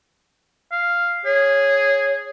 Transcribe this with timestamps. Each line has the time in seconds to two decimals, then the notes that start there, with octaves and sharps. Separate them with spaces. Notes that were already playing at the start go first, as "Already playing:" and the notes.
0.72 F5
1.25 G#4 C#5